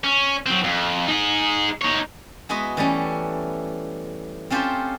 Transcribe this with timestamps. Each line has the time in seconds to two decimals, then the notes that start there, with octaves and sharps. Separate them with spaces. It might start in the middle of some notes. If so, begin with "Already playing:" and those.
0.04 C#4
0.46 F#3 C4
0.64 F2
1.07 D#4 G#4
1.82 D#4 C#5
2.49 G#3 B3 E4 F#4 B4 D#5
2.77 E3 G3 A3 C#4
4.50 C4 C#4 F4 G4 A4 C5